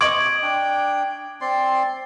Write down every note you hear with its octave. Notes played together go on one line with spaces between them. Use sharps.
D#5 C#6 D6 G#6 D7 F#7
D4 G5
C4 D5 C6